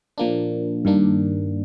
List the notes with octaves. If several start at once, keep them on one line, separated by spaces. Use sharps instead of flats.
A#2 F3 A#3 D4
G2 D#3 A#3 D4